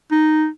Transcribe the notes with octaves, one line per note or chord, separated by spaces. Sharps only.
D#4